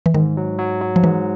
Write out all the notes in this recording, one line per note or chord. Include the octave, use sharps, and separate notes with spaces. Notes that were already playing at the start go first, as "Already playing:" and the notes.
E3
G#2 D#3
F#3
F#3
F#3
F3
G#2 E3